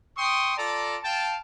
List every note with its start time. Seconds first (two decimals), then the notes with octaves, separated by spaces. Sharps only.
0.17 G5 C6 C#6 D#6
0.57 F4 A4 D5 A5 A#5
1.03 F5 G5 A5